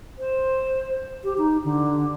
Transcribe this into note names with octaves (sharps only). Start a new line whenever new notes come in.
C5
G4
D#4
D3